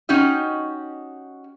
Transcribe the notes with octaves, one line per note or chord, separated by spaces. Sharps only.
C#4 D#4 F#4 G4 D#5